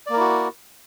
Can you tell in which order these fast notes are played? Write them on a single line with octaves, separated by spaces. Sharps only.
D5 A#3 A#4 E4 F#4